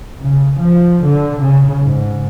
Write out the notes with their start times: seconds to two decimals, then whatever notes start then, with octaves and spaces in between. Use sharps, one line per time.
0.22 C#3
0.59 F3
1.06 D3
1.40 C#3
1.82 G#2